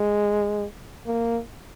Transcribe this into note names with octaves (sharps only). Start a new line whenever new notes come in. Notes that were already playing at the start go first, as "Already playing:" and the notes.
Already playing: G#3
A#3